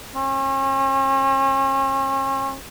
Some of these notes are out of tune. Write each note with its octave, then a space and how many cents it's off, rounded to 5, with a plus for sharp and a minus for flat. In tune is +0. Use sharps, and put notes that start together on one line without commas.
C#4 -40